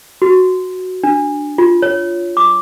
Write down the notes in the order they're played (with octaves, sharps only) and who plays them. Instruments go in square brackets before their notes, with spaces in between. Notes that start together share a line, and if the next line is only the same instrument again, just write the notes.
[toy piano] F#4
D4
F4
C#5
D6